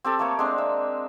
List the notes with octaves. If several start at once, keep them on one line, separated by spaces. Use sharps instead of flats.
C4 G4 A4
A3 A#3 C#5
G#3 C4 D4
E5